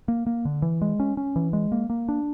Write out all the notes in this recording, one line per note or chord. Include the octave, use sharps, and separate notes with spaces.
A#3
A#3
D3
E3
G#3
C#4
C#4
E3
G#3
A#3
A#3
D4